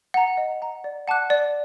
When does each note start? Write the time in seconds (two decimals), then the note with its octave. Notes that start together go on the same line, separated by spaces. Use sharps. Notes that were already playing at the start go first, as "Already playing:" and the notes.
0.14 F#5 A#5
0.37 D#5
0.62 F#5 A#5
0.84 D5
1.08 F#5 A5 D6 F#6
1.30 D5